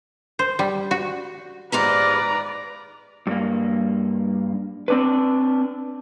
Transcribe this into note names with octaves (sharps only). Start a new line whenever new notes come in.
C5
G3
F#4
G#2 F4 G4 B4 D5 A#5
G2 A#3
C4 D4 B4